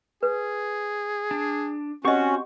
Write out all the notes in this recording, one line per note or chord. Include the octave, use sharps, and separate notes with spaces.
G#4 B4
D4
C4 C#4 F#4 G4 D#5 F#5 C#6